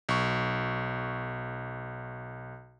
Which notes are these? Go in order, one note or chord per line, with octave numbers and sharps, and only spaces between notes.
B1 C#6